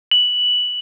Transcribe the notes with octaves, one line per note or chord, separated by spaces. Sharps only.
F#7